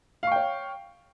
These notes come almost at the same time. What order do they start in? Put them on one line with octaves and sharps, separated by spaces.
F5 C#6 G5 C#5